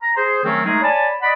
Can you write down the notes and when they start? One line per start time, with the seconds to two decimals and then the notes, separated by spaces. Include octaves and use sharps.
0.01 A#5
0.15 G#4 C5
0.44 D#3 F#3 A3 C4 C#4
0.64 G#3 A3 D#4 G#4 A#4
0.82 C#5 D5 G#5 A5 B5
1.21 D5 D#5 F#5 B5